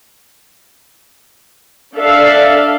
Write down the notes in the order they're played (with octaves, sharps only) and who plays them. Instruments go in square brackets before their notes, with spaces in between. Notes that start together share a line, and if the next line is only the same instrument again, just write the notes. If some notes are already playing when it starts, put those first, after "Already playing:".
[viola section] D4 A4 E5 F5